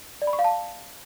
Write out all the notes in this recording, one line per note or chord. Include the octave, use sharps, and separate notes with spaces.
D5
B5
C#6
F5
A5